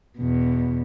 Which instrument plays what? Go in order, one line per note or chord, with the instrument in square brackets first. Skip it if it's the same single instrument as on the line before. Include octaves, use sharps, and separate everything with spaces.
[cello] E2 B2